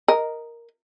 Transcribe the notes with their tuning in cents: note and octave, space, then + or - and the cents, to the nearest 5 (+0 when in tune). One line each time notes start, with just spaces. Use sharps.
A#4 +0 D#5 +0